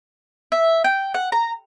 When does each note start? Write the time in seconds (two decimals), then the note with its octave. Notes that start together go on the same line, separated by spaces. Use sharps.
0.52 E5
0.84 G5
1.14 F#5
1.32 A#5